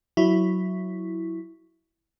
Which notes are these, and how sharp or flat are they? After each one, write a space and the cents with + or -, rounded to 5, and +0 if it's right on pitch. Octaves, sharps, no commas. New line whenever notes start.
F#3 +0 E4 +0